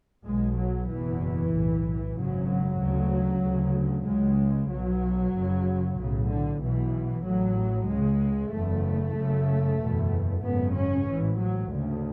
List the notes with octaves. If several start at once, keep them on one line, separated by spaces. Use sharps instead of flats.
B1 B2 G#3
F#3
F#1 E2 B2 E3
B1 A2
G#1 F#2 C#3 F#3
F#3
D2 C#3
D2 C#3
C#2 C#3 G#3
B1 B2 F#3
F#1 F#2 C#3
B1 A2 C#3
D3
B1 B2 E3
A1 A2 F#3
C#2 C#3 G#3
F#1 E2 C#3 A3
F#1 F#2 C#3
F#1 E2 B2
G#1 F#2 C#3 B3
C#4
G#2 E3
A1
F#3
D2 C#3